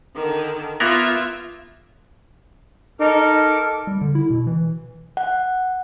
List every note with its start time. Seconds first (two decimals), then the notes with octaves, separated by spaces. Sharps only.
0.15 D3 D#3
0.80 A#3 B3 F4 A#4 E5
3.00 D#4 A4 A#4 D6
3.87 G3
4.01 D3
4.15 E4
4.30 B2
4.47 E3
5.17 F#5